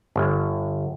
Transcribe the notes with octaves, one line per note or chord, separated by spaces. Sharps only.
G1